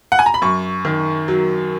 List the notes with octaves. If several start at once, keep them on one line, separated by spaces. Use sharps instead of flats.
F#5
G#5
A#5
B5
F#2 C#6
D#3
F#3